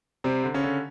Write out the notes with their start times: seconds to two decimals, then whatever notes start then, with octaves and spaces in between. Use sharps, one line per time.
0.24 C3 G3 C4
0.44 D3
0.54 C#3 C#4
0.64 D3